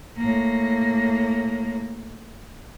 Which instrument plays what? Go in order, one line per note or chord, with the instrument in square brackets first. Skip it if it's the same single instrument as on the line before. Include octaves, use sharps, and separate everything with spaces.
[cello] A2 A#3